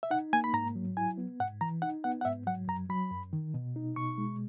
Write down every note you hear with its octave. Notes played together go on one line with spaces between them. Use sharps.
E5
D#4 F#5
A#3 G#5
B5
G#2 A#5
F#3
E4 G#5
B3
G#2 F#5
E3 A#5
D#4 F#5
B3 F#5
F#5
G#2 E5
F#3 F#5
F#2 A#5
F#3 B5
F#2
D#3
B2
D#4
B2 C#6
G#3